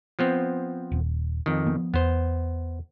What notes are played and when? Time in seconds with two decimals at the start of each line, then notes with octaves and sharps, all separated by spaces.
0.19 F3 B3 C4
0.92 D#1
1.46 F2 D#3
1.67 F3 B3
1.94 E2 B3 C5